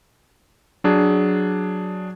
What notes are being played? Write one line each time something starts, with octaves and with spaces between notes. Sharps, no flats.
F#3 D4 G#4